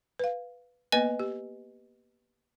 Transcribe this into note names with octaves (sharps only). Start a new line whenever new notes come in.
B4 F5
A#3 B3 B4 D#5 G#5
G4